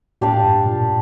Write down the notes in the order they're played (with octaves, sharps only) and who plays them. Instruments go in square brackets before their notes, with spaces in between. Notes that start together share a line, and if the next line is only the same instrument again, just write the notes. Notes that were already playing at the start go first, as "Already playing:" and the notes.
[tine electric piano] A2 [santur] D4 G4 D5 F5
[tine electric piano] G2
A#2